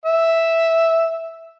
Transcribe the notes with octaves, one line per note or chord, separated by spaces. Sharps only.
E5